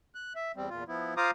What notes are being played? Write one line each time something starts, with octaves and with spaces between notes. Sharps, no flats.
F#6
E5
E2 G3 C4
E2 A#2 F4
F3 B3 E4
F4 C5 F5 A#5 D6 D#6